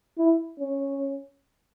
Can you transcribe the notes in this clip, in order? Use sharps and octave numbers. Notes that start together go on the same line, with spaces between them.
E4
C#4